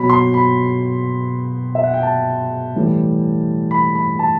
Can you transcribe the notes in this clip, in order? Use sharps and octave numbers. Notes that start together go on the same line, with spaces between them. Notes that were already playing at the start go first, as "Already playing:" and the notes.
Already playing: B2 F#3 B5
C6
B5
E5
F#5
G5
A5
A2 E3 G3
B5
B5
A5